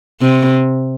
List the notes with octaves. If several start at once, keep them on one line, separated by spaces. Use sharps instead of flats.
C3